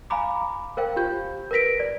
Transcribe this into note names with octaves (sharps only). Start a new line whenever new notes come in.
F5 G#5 A#5 B5 D6
A#4 C5 F5 G5
F4 G4 G6
A#4 B4 A#6 B6 D7
D5